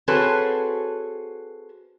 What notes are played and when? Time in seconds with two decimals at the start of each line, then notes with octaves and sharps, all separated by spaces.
0.08 C4 F#4 G#4 A4 B4 C#5